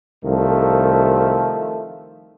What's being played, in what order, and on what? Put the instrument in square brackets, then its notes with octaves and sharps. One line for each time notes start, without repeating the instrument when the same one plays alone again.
[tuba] C2 [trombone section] D#3 F3 A3